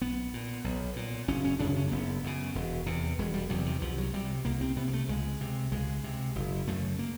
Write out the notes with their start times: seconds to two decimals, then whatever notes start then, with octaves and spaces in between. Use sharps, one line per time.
0.01 B1 B3
0.34 A#2
0.64 B1
0.96 A#2
1.28 F#1 C#4
1.44 C#4
1.59 F#2 C#3 D4
1.76 C#4
1.88 A#3
1.92 F#1 B3
2.24 F#2 C#3
2.55 E1
2.86 E2 C3
3.19 E1 G#3
3.34 G3
3.50 E2 C3 F#3
3.66 D#3
3.82 C2 F3
3.98 F#3
4.13 C3 G3
4.45 C2 A#3
4.61 C4
4.76 C3 B3
4.88 A#3
4.93 A3
5.08 C#2 G#3
5.41 C3
5.72 C#2 G#3
6.04 C3
6.36 F#1
6.67 F#2 C#3 A3
6.99 A#3